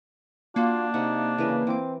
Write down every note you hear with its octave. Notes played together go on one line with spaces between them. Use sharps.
A#3 D4 F4 F#4
C3 D#4 F#5
C#3 E3 A#4 B4
E3 C4 D6